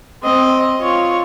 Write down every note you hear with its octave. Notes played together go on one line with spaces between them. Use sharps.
C4 D#5
F4 C#5